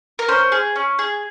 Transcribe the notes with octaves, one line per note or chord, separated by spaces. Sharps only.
A#4
C#4 C5
G#4
C#4
G#4